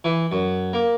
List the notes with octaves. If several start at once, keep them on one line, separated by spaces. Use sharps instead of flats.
E3
F#2
A#3